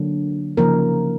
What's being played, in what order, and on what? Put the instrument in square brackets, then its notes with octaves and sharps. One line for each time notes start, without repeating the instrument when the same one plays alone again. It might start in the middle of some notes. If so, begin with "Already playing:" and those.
Already playing: [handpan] D3 F#3 A#3 D4
C#3 F3 A#3 D#4 A#4